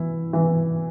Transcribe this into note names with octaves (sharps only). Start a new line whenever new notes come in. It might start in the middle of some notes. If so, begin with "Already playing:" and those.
Already playing: E3 E4
E3